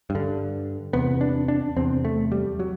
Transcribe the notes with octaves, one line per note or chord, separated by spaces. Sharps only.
G2
D3
E2 C3 B3
D4
D4
E2 C3 C4
A3
G3
F#3